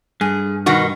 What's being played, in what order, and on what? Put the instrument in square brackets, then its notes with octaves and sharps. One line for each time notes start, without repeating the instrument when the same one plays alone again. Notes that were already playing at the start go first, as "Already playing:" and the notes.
[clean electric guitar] G2 [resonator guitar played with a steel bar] G#4
[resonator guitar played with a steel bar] B2 D#3 F#4